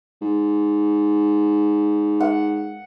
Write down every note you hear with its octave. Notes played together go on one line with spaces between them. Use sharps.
G#2
F#5